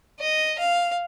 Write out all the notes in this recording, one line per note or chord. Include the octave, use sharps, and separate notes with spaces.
D#5
F5